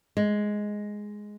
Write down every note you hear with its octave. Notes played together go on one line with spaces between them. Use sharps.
G#3